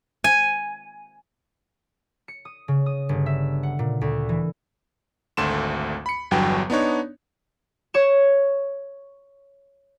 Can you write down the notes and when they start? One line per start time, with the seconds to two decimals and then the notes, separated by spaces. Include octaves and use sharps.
0.24 G#5
2.28 C#7
2.45 D#6
2.68 C#3
2.86 D#6
3.09 G1
3.26 E5
3.63 F#5
3.79 A#2
4.01 D2
4.29 E3
5.37 G#1 D2 A3 C6 E7
6.06 B5 C#7
6.31 G1 E2 G2 F#3 G5
6.70 B3 D4 D#4 C#5
7.94 C#5 C#6 E7